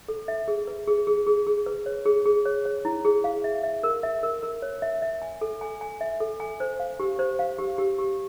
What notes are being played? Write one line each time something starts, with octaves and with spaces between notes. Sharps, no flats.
A4
E5
G#4
B4
G#4
G#4
G#4
G#4
B4
C#5
G#4
G#4
C#5
C#5
E4
G#4
F5
E5
E5
A#4
E5
A#4
A#4
C#5
E5
E5
G#5
A4
G#5
G#5
E5
A4
G#5
C5
F5
G4
C5
F5
G4
G4
G4